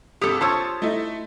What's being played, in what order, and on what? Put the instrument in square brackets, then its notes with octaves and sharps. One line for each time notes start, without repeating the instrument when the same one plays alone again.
[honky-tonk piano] G#1 D#6 [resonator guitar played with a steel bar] G4 A4
[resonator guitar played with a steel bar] F4 C5 C#5 [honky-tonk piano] A5 D#6 E6
[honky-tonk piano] A3 D#4 E4